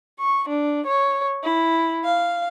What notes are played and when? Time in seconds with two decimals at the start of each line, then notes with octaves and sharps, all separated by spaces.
0.20 C#6
0.49 D4
0.87 C#5
1.44 E4
2.05 F5